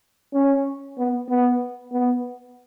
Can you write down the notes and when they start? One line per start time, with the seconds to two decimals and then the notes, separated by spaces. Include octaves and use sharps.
0.33 C#4
0.98 B3
1.29 B3
1.92 B3